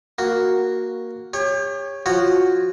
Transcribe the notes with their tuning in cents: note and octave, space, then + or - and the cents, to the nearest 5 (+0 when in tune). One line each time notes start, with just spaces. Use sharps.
A#3 +0 F#4 +0
G4 +35 C#5 -5
F3 +0 F#4 +0 C#5 +0